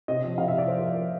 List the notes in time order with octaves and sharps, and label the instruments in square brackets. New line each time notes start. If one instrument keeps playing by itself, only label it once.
[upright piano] C3 D#5
F3 D#5
C3 F5
E5
C3 D5
F3 C5
A#4
F3
F3